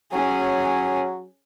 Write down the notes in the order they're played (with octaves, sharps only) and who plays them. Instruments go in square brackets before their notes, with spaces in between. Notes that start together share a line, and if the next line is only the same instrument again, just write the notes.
[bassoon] F#3 [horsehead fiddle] C#4 G#4